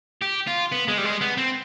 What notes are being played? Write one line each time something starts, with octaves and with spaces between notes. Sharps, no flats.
G4
F4
B3
G#3
G3
G#3
B3
C4